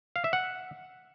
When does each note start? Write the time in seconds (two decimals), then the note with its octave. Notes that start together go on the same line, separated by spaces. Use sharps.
0.16 F5
0.24 E5
0.33 F#5